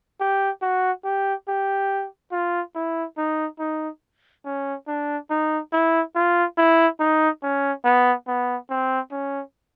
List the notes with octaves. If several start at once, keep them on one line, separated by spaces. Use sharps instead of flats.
G4
F#4
G4
G4
F4
E4
D#4
D#4
C#4
D4
D#4
E4
F4
E4
D#4
C#4
B3
B3
C4
C#4